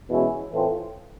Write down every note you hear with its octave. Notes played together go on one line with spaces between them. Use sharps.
E2 B2 G#3 C#4 E4
A2 E3 A3 C4 F4